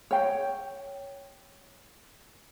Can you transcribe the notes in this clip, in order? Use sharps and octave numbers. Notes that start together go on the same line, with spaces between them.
C#5 G5